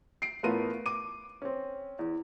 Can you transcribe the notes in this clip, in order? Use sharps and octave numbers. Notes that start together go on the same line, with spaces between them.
C7 D7
A1 A3 B3 F4 A#4 D#7
D6 D#7
C4 C#4
E2